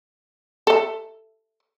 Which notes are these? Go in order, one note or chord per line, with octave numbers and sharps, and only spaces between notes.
A4 E5